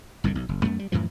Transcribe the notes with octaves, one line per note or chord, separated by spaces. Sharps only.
G1 C2 G2 D3
B1
F#1
F#2 A3 B3
G3
F#2 A2 E3 F3